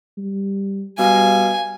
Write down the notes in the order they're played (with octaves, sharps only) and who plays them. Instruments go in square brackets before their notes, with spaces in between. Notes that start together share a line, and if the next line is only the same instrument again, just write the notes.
[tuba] G3
[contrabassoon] B2 [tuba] G3 [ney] F5 [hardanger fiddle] G#5